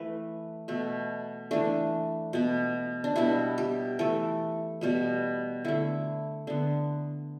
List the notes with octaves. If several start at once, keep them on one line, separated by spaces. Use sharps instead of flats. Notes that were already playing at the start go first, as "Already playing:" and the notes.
Already playing: E3 A3 B4
B2 A3
E3 A3 D4
B2 B3
D4
B2 G3 B3 E4
G4
E3 A3 A4
B2 G3 B3
D3 A3 E4
D3 B3